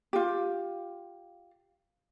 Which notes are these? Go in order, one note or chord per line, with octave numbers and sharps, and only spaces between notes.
F4 G4